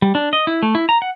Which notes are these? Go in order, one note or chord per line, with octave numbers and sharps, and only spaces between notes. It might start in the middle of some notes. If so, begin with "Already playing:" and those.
G3
D4
D#5
E4
A3
E4
A#5
F#5